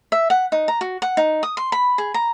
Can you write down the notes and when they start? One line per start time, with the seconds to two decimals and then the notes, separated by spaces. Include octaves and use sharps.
0.12 E5
0.30 F#5
0.52 D#4
0.68 A#5
0.81 F#4
1.02 F#5
1.17 D#4
1.43 D#6
1.57 C6
1.72 B5
1.98 G#4
2.14 A#5